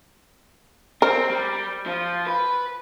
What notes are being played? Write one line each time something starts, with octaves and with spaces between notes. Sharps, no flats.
C4 A#4
G3
F3
B4